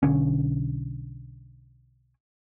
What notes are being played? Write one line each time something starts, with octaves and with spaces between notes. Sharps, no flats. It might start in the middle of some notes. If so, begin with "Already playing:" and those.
B1 D3 C#4